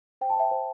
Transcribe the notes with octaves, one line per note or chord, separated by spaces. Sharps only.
C5 G5
A5
C5 E5 G5
C5